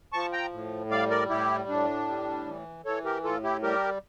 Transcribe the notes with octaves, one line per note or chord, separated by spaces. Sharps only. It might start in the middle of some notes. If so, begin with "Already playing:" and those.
F3 A5 C#6
G5 A#5
A2
G3 D5 F5
A#4 D5
A2 E4 G4
A2 D4
G3
E3
E3 A4 C#5
G4 A#4
A2 F4 A4
E4 G4
G3 G4 A#4